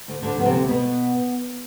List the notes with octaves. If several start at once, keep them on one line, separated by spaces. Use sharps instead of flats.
D2
D2 D3 D4
F3 B3
C3 C4
D2
B2 B3